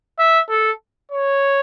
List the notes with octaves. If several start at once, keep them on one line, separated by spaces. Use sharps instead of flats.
E5
A4
C#5